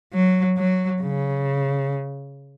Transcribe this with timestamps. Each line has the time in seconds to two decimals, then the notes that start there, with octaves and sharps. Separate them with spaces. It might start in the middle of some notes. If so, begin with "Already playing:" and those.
0.13 F#3
0.57 F#3
1.02 C#3